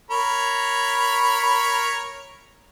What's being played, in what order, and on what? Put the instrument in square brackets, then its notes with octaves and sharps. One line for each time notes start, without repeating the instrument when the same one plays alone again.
[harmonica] A#4 C#5 B5